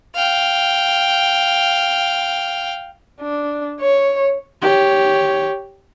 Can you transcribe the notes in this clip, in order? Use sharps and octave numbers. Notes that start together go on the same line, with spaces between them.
F5 G5
D4
C#5
G4 C#5